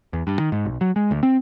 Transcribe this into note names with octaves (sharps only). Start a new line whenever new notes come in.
E2
G2
D#3
G#2
B1
F#3
G#3
D2
C4